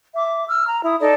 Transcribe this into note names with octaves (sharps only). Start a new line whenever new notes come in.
E5 D6
E6 F6
A#5
E4 D#6
D#4 A4 D5 D#5